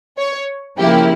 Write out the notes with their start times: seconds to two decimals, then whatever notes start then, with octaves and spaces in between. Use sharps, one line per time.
0.18 C#5
0.78 C#3 F3 A#3 E4 G4